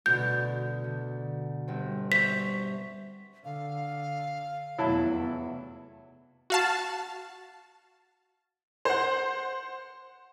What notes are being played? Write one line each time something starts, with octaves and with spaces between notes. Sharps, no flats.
D2 B2 G6
D3
G1 C4
C5 E5 C#6 B6
D3 F5
F1 E2 F#3 E4 A5
F#4 F5 A5
C5 F#5